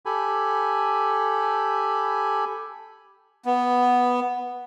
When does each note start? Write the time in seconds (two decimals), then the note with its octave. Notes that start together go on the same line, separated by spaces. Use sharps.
0.06 G4 A4 G#5 B5
3.45 B3